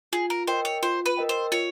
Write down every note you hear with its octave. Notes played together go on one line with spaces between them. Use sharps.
F4 G#4
A#4
A#4 C5 D#5 G5
C#5
F4 C5
B4
A#4 D#5 G5
C5
F4 C#5